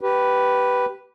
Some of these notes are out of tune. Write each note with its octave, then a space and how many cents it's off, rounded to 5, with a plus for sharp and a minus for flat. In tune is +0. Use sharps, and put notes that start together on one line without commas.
G4 -15 B4 +0